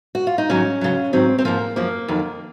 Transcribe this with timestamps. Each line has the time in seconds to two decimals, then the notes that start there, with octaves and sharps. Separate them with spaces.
0.15 F#4
0.27 F4
0.38 D#4
0.50 G#2 D#3 F#3 C#4
0.81 F2 C#3 F#3
1.13 G#2 D#3 F#3 C4
1.38 C4
1.45 G#2 F3 A#3
1.76 F#2 F3 A#3
2.08 F2 D#3 F#3